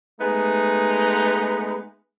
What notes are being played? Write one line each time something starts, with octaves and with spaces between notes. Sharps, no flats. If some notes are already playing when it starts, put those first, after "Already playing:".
G#3 A3 B3 D#4